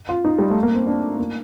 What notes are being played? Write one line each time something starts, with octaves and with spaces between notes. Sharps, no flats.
F4
D#4
G3
A3
A#3
C4
D4
A#3